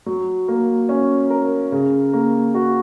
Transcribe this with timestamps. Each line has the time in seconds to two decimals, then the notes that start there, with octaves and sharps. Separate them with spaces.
0.06 F#3
0.48 A#3
0.89 C#4
1.30 A#4
1.72 C#3
2.13 A#3
2.55 F#4